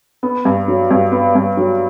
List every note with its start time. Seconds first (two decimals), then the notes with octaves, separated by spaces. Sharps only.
0.23 B3
0.45 G2
0.68 F#3
0.91 G2
1.12 B3
1.35 G2
1.57 F#3